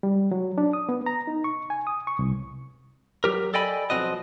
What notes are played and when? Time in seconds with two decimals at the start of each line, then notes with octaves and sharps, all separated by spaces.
0.03 G3
0.31 F#3
0.58 D4
0.73 D#6
0.89 B3
1.06 A#5
1.27 D#4
1.44 C#6
1.70 G#5
1.87 D#6
2.07 C#6
2.19 C2
3.24 F#3 G4 A#4
3.54 A4 D5 D#5 G5 G#5 B5
3.90 B1 G2 F3 C4 F#4 D#5